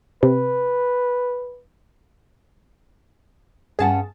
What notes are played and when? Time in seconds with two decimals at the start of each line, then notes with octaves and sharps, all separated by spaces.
0.23 C3 B4
3.79 G2 C#4 G#4 F#5 A5